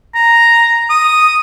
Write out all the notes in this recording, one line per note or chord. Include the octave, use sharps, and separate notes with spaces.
A#5
D#6